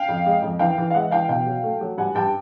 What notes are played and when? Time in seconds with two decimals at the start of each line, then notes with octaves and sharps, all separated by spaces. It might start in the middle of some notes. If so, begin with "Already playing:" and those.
Already playing: F5 G5
0.09 F2
0.26 G#3
0.42 F2
0.59 E3 F5 G5
0.78 E3
0.90 F5
0.94 G#3 E5 F#5
1.11 E3 F5 G5
1.28 B2 F5 G5
1.46 F#3
1.63 A3
1.81 F#3
1.98 G2 F#5 G#5
2.15 G2 G5 A5